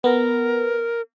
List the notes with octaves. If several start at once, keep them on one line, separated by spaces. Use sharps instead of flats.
B3 A#4